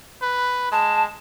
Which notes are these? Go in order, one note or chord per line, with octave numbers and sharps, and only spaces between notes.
B4
G#3 A5